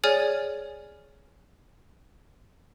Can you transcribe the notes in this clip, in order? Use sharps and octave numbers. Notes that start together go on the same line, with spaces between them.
G#4 C#5 D5 G#5 F6